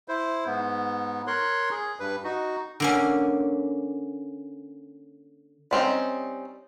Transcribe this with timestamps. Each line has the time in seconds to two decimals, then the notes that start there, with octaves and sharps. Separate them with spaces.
0.08 E4 C5
0.46 G#2 B3
1.27 A#4 C#5 C6 F#6
1.71 G#4
2.00 G2 B4
2.24 D#4 F#4
2.80 D3 A#3 C#4
5.71 G3 C4 C#4 D#4